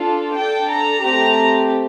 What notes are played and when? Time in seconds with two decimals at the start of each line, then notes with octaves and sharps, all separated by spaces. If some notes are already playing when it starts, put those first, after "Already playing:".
Already playing: D4 F4 A4
0.35 D4 A4 G5
0.70 A#5
1.03 A3 C4 G4 A#5